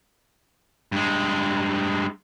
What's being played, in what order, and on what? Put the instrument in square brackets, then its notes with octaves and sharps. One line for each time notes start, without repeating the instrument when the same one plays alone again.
[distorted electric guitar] G2 G#3